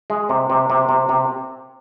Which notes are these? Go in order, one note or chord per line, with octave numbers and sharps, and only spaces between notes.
G#3
C3
C3
C3
C3
C3